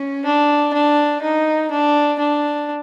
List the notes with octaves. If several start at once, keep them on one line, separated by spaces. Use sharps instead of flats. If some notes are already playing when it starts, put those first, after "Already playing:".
Already playing: C#4
D4
D4
D#4
D4
D4